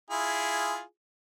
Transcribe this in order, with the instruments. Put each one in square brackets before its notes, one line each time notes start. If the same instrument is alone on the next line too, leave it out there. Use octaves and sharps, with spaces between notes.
[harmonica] E4 F4 G#4